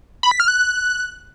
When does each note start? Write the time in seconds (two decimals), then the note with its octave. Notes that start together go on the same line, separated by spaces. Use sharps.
0.23 B5
0.31 B6
0.40 F6
0.48 F#6